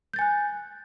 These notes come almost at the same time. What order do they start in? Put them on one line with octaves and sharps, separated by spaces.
G6 A6 G#5 F#6